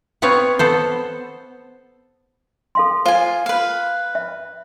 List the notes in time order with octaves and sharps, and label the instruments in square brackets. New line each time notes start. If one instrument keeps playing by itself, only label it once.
[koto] B3 C4 B4 C#5 F5
B3 A4 C5
[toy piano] A4 F5 C6
[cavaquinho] F4 G#5 [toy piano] C5
[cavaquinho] B4 F5
[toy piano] E5